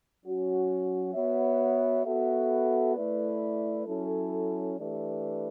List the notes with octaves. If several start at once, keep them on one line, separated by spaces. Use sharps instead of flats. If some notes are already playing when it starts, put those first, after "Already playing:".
F#3 C#4 F#4
B3 F#4 C#5 E5
B3 F#4 A4 E5
A3 E4 B4 D5
F#3 C#4 E4 A4
E3 A3 D4 G4 B4